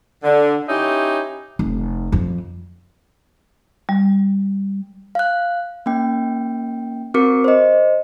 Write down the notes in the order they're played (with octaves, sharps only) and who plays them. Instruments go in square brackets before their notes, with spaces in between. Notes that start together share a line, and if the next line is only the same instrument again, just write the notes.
[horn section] D3
C#4 D#4 E4 G4
[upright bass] F1
F2
[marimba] G3
[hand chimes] F5 F#6
A#3 C#4 G5
C4 F#4 A#4 D6 C#7
C5 D#5